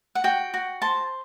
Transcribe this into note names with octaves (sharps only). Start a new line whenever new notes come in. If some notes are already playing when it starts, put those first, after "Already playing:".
F#5
F#4 G5
F#4
C5 A5